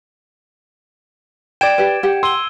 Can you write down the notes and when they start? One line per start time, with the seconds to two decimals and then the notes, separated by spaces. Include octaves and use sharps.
1.61 D5 G5 G#6 D7 E7
1.78 G4 B4
2.03 G4 F#5
2.23 C6 E6 D#7 G7